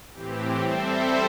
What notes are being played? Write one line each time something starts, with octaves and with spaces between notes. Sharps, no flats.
A2 E3 C4 G4
G3 C4 A4 C5 E5